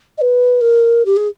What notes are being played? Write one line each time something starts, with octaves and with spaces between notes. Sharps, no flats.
D#5
B4
A#4
G4
G#4